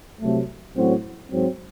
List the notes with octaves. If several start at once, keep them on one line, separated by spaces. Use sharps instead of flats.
C2 C3 F#3 A3
A1 A2 F#3 C4 F#4
G#2 F#3 C4